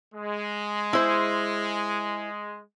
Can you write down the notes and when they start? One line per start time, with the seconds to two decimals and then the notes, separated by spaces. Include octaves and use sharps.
0.14 G#3
0.93 E4 C5